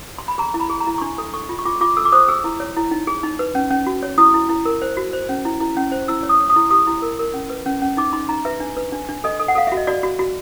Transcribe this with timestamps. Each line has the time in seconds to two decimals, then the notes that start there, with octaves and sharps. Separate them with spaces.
0.18 C6
0.28 B5
0.38 G#4 A#5
0.54 E4
0.60 B5
0.70 G#4
0.80 A#5
0.87 E4
0.98 C#6
1.01 D4 C6
1.18 A4
1.34 A4 C#6
1.49 F4
1.59 C#6
1.65 F4 D6
1.81 F4 D6
1.97 A4 E6
2.05 D6
2.12 C5 D#6
2.29 G#4 E6
2.44 E4
2.60 C#5
2.76 E4
2.91 D#4
3.07 G#4
3.23 D#4
3.39 B4
3.55 C#4
3.70 C#4
3.87 F#4
4.03 C#5
4.18 E4 D#6
4.34 E4
4.49 E4
4.65 A#4
4.82 C5
4.97 F#4
5.13 C5
5.29 C#4
5.45 E4
5.60 E4
5.77 C#4
5.92 C5
6.08 E4 E6
6.23 C#5
6.29 D#6
6.40 C#5
6.50 D#6
6.56 E4
6.70 G4 D#6
6.87 E4
7.02 A#4
7.19 A#4
7.34 C#4
7.50 B4
7.66 C#4
7.82 C#4
7.97 D#4 D6
8.13 D#4 C6
8.29 D#4 A#5
8.45 B4 E5
8.60 D4
8.77 B4
8.92 D4
9.09 D4
9.24 A4 D#5
9.39 A4
9.48 F#5
9.55 A4 F5
9.67 F#4 E5
9.77 D#5
9.87 F#4 D5
10.03 F#4
10.19 F#4